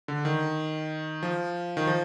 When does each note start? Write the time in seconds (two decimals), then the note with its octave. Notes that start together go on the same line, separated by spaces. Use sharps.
0.08 D3
0.25 D#3
1.23 F3
1.77 D#3
1.87 F3